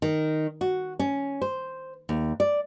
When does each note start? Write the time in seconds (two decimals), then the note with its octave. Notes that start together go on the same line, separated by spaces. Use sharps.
0.02 D#3
0.61 F#4
0.99 C#4
1.42 C5
2.09 D#2
2.40 D5